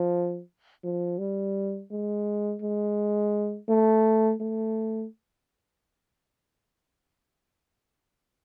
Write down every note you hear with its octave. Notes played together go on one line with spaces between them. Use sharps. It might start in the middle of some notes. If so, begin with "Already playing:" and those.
Already playing: F3
F3
G3
G#3
G#3
A3
A3